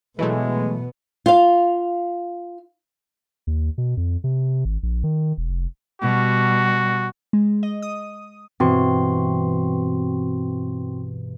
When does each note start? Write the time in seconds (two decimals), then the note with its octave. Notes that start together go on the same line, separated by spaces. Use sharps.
0.19 B2 E3 F#3 G#3 A3 B3
1.26 F4 F5
3.47 D#2
3.78 B2
3.97 F2
4.24 C3
4.65 G#1
4.83 A#1
5.04 D#3
5.37 E1
5.49 F1
6.02 B2 G3 F#4
7.33 G#3
7.63 D#5
7.82 D#6
8.60 G2 B2 E3 C4 F#4 C6